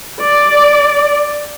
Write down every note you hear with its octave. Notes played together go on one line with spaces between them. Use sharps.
D5